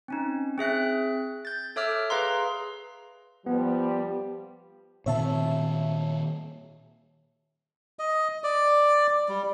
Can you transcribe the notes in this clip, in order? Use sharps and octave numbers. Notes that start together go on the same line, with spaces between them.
C4 C#4 D#4
C4 G#4 E5 F#6
G6 A6
A4 C#5 E5 D6 E6 F6
G#4 B4 F5 A#5 C6
F3 G3 B3
A#2 D#3 C4 C#5 E5 A5
D#5
D5
G3